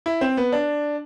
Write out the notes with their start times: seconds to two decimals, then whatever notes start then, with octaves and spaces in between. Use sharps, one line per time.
0.06 E4
0.21 C4
0.37 B3
0.52 D4